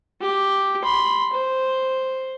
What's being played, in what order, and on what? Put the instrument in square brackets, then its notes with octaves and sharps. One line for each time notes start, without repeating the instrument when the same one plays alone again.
[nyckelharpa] G4
B5 C6
C5